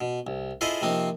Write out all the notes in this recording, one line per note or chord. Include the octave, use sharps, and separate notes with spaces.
B2
C2
E4 F4 G#4 A4 C5 D#5
C3 F3 A#3 C4 D#4